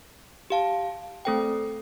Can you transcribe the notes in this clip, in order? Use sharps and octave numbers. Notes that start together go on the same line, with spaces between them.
G4 F5 A5
A3 C4 A4 C5 G5